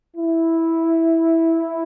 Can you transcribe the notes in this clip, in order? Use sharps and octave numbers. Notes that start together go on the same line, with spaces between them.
E4